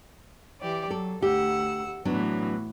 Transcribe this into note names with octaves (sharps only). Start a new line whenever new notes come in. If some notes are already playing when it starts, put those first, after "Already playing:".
E3 G4 D5
F#3 A4
D2 G4 F#5 E6
A2 E3 F#3 B3 D4 F#4